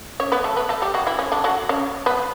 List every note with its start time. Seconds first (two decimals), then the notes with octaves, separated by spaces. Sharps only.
0.20 C#4 C#5
0.32 B3 B4
0.44 A3 A4
0.56 B3 B4
0.69 A3 A4
0.82 G3 G4
0.94 F#3 F#4
1.07 E3 E4
1.19 C#4
1.32 D3 D4
1.44 F#3 F#4
1.69 C#4 C#5
2.06 B3 B4